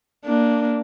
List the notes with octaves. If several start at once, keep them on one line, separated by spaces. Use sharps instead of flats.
A#3 D4